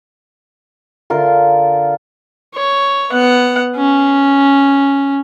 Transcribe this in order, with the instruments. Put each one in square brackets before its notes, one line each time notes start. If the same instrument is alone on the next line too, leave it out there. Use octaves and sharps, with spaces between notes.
[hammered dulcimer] D3 F4 A#4
[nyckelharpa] C#5
B3 F#5
C#4